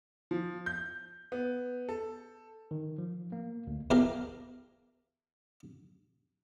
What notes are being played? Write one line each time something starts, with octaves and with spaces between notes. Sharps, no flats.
F3
G6
B3
A4
D#3
F3
A#3
D2
E2 E3 G4 A#4 F5 A#5